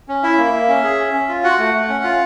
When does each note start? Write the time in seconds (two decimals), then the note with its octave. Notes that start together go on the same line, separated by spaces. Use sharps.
0.09 C#4
0.23 E4 E5
0.38 A#3
0.54 A#3
0.68 C#4
0.84 G#4
0.99 C#4
1.13 C#4
1.28 F4
1.44 F#4 F#5
1.59 A3
1.74 A3
1.89 C#4
2.04 F4